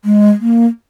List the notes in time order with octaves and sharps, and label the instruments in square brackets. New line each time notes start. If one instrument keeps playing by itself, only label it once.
[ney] G#3
A#3